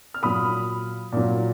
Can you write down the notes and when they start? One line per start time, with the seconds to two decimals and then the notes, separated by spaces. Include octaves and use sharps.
0.14 F6
0.23 A#2 F#3 B5 D#6
1.12 A#2 F#3